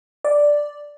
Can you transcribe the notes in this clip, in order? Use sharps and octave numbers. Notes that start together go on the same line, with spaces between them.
D5